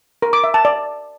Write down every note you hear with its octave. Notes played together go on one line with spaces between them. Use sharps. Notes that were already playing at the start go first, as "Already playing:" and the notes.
A#4
D6
E5
A5
D5